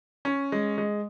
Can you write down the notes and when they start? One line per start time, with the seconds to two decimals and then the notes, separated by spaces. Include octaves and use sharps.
0.25 C#4
0.52 G#3
0.78 G#3